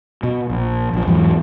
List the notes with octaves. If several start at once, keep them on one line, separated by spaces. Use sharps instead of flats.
B2
A#1
A#1 F3
E2 G#2 E3 F#3